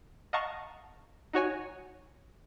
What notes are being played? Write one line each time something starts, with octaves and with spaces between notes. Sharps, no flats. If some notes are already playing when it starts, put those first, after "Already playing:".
D#5 F5 F#5 A5 A#5 C#6
D#4 F#4 C#5 G#5